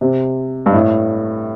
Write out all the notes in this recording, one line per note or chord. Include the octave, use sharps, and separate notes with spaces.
C3
G2
A2